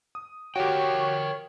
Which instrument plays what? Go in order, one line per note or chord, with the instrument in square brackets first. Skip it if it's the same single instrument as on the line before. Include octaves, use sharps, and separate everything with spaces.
[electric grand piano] D#6
[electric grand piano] F#4 G4 [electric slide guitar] A#4 F5 G5 [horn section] C#5